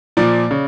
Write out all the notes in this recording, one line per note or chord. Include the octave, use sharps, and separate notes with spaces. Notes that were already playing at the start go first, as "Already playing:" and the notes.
A#2 F3 D5
C#3